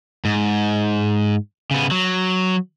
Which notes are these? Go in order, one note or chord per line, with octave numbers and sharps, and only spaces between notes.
G#2
C#3 B3
F#3